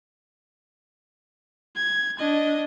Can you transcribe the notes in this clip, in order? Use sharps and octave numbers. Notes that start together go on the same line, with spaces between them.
G#6
D4 D#5